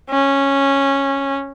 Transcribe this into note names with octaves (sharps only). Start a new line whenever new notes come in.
C#4